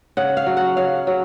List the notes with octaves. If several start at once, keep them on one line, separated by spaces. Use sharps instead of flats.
C#3 F#5
F5
F#3
F#5
C#3 F5
F#3